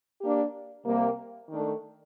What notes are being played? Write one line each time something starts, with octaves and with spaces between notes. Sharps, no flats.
A#3 D4 G4
C3 G3 A#3
D#3 A3 D4